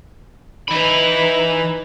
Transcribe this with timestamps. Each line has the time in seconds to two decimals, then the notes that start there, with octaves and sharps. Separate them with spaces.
0.68 E3 D#4 B4 B5